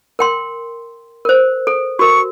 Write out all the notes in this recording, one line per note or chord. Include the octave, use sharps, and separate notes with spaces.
A#4 G5 C6
A#4 C5
A4
F#4 A#4 C#6